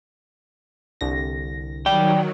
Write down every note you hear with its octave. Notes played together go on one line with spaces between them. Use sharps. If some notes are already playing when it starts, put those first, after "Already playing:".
C2 D3 A#6
D#3 F#3 D5 G5